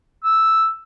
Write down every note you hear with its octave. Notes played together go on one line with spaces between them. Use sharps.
E6